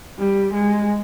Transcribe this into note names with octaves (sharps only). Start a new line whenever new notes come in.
G3
G#3